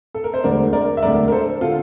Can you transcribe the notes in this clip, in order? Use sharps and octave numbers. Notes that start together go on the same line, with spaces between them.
A4
A#4
C5
E1 D2 D3 A#4 D5
A#4 D5
E5
E1 D2 D3 A#4 D5
A#4
A4 C5
D3 F4 A4